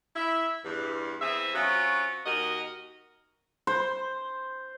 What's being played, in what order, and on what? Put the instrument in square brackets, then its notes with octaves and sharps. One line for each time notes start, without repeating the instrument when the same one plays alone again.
[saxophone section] E4 E5
E2 G2
E2 C4 G#4 E5
F#3 C4 C#4 F4 F#4
D#2 F#4 A#4 D#5
[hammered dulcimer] C5